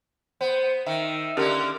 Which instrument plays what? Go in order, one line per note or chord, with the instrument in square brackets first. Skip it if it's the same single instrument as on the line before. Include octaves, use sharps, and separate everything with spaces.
[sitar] B3 [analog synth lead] C5
[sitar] D#3 [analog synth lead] E5
[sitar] D3 A#3 [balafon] C#4 G4 A#4 [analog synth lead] F6